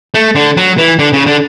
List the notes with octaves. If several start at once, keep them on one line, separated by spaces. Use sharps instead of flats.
A3
D3
F#3
E3
D3
C#3
D3